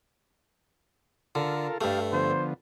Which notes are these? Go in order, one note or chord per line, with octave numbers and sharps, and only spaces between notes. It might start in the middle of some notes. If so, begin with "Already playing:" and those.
D3 F4 A4 A#4
G2 A3 G4 A4 F5
D3 F3 B3 C5